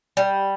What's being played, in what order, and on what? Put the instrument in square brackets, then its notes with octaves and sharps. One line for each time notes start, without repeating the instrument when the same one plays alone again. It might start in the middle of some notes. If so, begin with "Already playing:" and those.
[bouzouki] G3